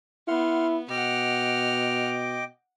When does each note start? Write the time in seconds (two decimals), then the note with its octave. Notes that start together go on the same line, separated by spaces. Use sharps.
0.28 B3 E4 F#5 C6 F6
0.90 B2 D#5 F#5 G5 D6 F6